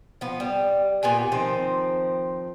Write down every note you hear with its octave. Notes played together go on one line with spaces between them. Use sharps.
F3 B3
G3
A#2 B3 G4 G#5
D#3 F3 C4